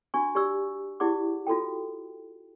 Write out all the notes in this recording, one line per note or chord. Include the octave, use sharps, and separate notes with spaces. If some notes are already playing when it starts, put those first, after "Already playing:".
D4 F#4 G#5 C#6
G4 D5 C#6 E6
E4 G4 G#4 D5 F#5 D6
F4 F#4 A4 G5